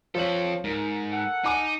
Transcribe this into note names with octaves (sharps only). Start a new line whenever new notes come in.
F2 F3 A4 C#5 F#7
G#2 A#4
A4 F#5
D#4 G#5 D6